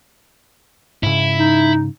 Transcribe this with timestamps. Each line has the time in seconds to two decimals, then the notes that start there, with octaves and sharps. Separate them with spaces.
1.03 G#2 C#3 E4
1.38 D#4